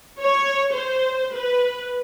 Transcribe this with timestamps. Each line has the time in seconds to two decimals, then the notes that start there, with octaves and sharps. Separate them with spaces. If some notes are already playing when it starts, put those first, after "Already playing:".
0.20 C#5
0.74 C5
1.34 B4